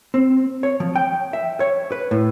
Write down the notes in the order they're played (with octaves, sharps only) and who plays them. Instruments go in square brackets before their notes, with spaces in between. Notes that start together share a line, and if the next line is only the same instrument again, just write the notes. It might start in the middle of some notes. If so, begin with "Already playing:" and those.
[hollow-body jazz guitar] C4
C#5
F3
G5
E5
C#5
B4
A2